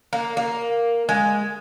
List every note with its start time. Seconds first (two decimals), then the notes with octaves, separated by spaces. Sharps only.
0.13 A#3
0.37 A#3
1.09 G#3